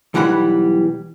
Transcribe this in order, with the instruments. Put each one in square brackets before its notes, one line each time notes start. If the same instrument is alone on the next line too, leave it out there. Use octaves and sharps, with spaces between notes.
[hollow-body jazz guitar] B1 E3 G3 F#5 A#5 B5